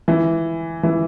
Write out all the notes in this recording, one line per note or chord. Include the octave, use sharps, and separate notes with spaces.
E3
E3